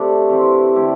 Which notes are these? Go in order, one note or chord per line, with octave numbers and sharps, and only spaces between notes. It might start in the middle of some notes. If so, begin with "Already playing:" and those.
Already playing: C3 A3 D4
C3 E3 C4 E4
D3 A3 E4 G4